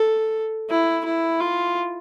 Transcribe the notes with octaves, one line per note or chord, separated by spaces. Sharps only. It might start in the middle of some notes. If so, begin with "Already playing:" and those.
Already playing: A4
E4
E4
F4